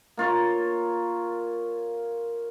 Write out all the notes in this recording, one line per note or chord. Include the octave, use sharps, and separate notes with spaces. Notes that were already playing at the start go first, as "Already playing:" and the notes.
A#3 F4 C#5